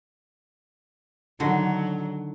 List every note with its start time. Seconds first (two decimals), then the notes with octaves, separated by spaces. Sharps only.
1.40 D3 D#3 F#3